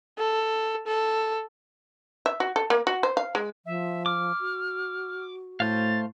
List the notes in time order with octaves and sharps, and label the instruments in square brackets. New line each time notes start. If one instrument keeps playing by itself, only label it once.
[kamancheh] A4
A4
[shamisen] E5
F#4
A4
A#3
F#4
C5
F5
G#3
[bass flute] F3 [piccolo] E5
[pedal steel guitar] D6 [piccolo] F6
[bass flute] F#4
[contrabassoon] A2 [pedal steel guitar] A3 C5 F5 [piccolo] A6